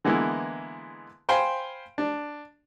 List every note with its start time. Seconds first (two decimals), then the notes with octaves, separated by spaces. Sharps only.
0.05 D3 E3 G#3 A#3 B3 E4
1.29 C5 F5 G5 G#5 B5 C6
1.98 D4